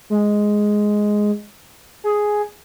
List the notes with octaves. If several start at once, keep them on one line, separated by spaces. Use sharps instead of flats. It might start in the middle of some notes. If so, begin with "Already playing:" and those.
G#3
G#4